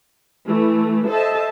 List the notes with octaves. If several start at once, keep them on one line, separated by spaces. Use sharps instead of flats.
E3 A3
A4 C5 D#5 E5 A5